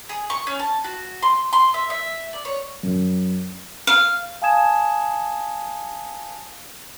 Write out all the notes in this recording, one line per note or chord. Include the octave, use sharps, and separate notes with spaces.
G#4
C#6
C#4
A5
F#4
C6
C6
E5
E5
D5
C#5
F#2
F5
F5 G#5 A5 D#6 G#6 E7